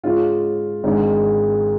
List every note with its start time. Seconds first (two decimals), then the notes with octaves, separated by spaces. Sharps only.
0.03 G#2 G#3 C#4 F4
0.84 G#1 G#2 G#3 D4